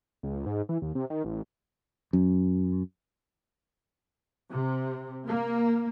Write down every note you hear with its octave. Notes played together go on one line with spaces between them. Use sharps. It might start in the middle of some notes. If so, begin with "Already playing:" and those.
C#2
G#2
E3
D#2
C3
D#3
A1
F#2
C3
A#3